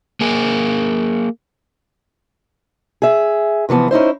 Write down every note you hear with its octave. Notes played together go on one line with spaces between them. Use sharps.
A#3 G#4
G#4 E5
C3 E3 F3 B3
C#4 D#4 E4 C5